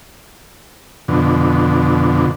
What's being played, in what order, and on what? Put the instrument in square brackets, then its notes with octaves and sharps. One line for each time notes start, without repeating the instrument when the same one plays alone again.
[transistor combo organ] F2 B2 D3